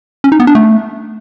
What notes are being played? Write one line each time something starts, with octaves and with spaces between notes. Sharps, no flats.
C#4
D#4
B3
D4
A3